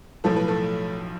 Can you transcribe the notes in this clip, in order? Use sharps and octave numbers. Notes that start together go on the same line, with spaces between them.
B1 A2 F3 A3 A4
B4
A3 A4